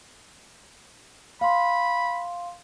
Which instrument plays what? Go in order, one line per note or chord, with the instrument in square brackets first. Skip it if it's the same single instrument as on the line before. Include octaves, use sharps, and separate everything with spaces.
[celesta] F5 C6 [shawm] B5